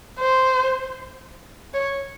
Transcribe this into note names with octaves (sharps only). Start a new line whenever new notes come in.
C5
C#5